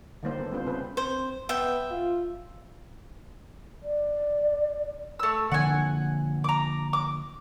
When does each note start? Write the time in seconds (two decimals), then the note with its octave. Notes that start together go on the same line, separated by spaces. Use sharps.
0.23 D3 D#3 G3 A#3 D#4 C5
0.39 B3 A4
0.51 G3 B3 C4 D4 F4 C5
0.66 C#3 B3 C4 B4 C5
0.97 C4 C5
1.49 B3 E5 G5
1.91 F4
3.83 D5
5.19 A3 E6
5.52 D3 F3 A#3 F#5 G#5
6.44 A#5 D6
6.93 D6